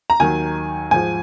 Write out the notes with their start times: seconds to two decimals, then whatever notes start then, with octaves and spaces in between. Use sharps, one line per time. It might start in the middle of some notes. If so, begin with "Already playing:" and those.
0.10 A#5
0.20 D#2 D#3 F#3 G#5
0.91 G#2 F3 G#5